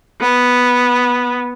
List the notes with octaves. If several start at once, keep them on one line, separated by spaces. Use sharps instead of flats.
B3